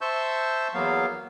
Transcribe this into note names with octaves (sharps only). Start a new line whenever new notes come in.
C5 E5 A5 C#6 E6 G6
E2 F#3 A#3 B3 F5